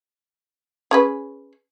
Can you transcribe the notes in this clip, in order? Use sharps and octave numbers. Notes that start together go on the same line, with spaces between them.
C#4 G#4 B4